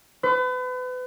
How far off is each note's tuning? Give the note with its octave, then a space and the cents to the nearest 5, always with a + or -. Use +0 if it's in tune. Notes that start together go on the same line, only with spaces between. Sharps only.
B4 +35